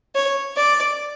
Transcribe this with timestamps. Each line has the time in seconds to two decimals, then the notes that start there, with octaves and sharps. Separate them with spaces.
0.15 C#5
0.57 D5